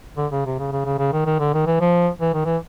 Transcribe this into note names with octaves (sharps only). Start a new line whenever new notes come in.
D3
C#3
C3
C#3
C#3
C#3
C#3
D#3
D#3
D3
D#3
E3
F3
E3
D#3
E3